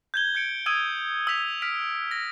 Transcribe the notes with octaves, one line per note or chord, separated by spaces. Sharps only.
G6 G#6 G7
G6 G#6 C#7 D7
D#6 E6 G#6 D#7 G7
E6 G6 B6 F7
F6 B6 D7
A#6